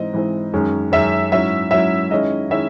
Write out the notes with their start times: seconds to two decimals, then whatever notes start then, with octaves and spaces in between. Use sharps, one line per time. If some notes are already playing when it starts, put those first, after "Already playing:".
Already playing: G#2 E3 C4 D#5
0.13 G#2 E3 C4
0.53 F#2 D#3 G#3 C#4
0.92 F#2 D#3 G#3 C#4 E5
1.32 G#2 F#3 C#4 E4 E5
1.71 G#2 F#3 C#4 E4 E5
2.11 D#3 G#3 C#4 E4 D#5
2.50 D#3 G#3 C#4 E4 E5